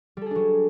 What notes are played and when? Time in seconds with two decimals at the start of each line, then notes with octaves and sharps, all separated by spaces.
0.17 G3
0.21 A4
0.26 G#4
0.31 D4
0.35 F#3